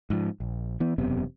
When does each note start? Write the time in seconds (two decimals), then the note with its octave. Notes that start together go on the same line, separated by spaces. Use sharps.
0.10 G#2 F3
0.40 A#1
0.80 E3 B3
0.98 E1 F#2 C3 B3